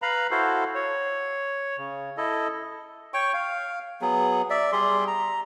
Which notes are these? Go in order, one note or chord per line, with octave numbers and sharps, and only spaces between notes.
B4 F5 A#5 B5
E4 F#4 A4 C5 F5
C#5
C#3
E4 A4 D#5
C#5 G5 C#6
F5
F#3 B3 G#4
D5 E5
G3 G#4 C6
A#5